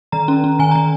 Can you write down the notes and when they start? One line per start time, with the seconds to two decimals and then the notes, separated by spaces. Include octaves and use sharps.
0.12 D#3 A#5
0.28 C#4
0.44 C#4
0.59 D#3 G#5
0.71 A#5
0.75 D#3